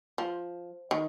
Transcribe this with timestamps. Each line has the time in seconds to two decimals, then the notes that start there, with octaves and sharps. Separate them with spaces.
0.18 F3
0.91 D#3